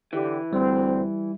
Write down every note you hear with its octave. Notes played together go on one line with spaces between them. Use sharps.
D3 E3 G4
D2 G3 C4